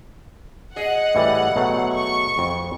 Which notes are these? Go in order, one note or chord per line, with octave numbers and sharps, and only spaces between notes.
G#4 D#5 F#5
A2 E3 G3
B2 F#3 A3
C#6
F2